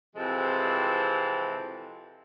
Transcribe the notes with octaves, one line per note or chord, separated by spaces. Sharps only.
C3 E3 F3 G#3 C4 A4